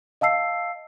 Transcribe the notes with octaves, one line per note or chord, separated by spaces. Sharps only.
D#5 F5 A5 E6 C7